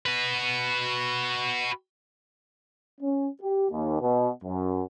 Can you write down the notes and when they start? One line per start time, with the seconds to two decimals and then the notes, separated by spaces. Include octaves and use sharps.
0.06 F#4 B4
3.01 C#4
3.42 G4
3.71 D#2
4.01 B2
4.44 F#2